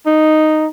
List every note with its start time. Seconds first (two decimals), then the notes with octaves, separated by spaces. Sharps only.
0.06 D#4